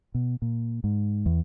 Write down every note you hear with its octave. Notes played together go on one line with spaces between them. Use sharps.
B2
A#2
G#2
E2